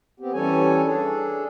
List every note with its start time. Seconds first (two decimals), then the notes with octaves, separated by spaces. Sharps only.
0.20 B3 C4 G4
0.33 E3 G3 C#4 A4 C#5 G#5
0.85 D4 G#4 A4